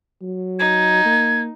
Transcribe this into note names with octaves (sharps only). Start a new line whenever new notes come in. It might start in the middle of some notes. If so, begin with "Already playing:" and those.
F#3
D#4 G#6
A#3